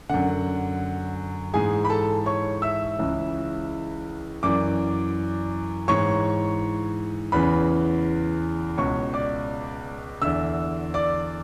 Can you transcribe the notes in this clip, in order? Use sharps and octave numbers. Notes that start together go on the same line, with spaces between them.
F#2 D3 F#5
G#2 E3 G#4 G#5
B5
A4 A5
C#5 C#6
E5 E6
C#2 C#3 E3
F#2 E3 D5 D6
G#2 E3 C#5 C#6
E2 C#3 E3 B4 B5
C#2 B2 C#5 C#6
D5 D6
E2 D3 E5 E6
D5 D6